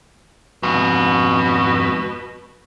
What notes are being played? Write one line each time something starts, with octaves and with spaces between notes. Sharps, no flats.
F2 G#2 B2